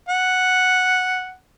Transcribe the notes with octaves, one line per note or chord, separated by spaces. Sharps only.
F#5